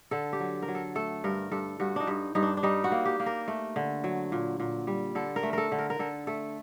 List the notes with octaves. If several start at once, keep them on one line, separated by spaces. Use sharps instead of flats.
D3 A4
G4
F#3
A#4
F#3
A4
A3 A4
G2 A#4
G2 A4
G2 F#4
D4 D#4
G2
G2 D#4
D4
D4
G3 D#4
F#4
A#3
G4
A#3
A#4
A3
D3
F#3
A#2
A#2
G3
D3 A4
A#4
A3
A4 A#4
D3
A#4
A#4
D3 A4
A3 A4